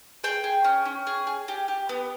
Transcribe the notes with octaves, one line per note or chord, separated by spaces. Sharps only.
G#4 G5
G#4
C#4
C#4
G#4
G#4
G4
G4
B3